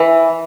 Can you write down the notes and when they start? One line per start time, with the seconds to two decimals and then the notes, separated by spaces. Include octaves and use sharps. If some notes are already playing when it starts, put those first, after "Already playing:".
Already playing: E3